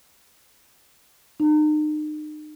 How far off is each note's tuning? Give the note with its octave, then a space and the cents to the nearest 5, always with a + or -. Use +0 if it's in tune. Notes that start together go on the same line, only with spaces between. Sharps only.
D#4 -40